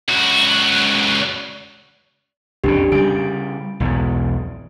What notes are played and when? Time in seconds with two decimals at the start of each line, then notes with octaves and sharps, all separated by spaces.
0.08 C#2 F#4
2.64 C2 F2 C#3 D4 G4
2.92 C#3 G3 D7
3.80 B1 E2 G#2